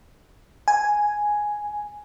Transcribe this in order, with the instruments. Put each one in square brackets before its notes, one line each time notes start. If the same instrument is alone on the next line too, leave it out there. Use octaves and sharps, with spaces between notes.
[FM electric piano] G#5